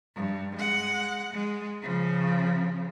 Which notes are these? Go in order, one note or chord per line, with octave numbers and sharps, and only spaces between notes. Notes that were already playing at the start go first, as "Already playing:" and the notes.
G2
G#3 F#5
G#3
C#3 F3